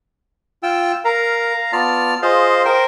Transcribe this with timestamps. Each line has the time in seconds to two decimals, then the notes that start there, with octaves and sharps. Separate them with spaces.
0.63 F4 G5 E6
1.05 A#4 F5 A#5
1.73 B3 F4 D5 A5 F6
2.22 F4 G#4 C5 D#5 F5
2.65 A#4 C5 G5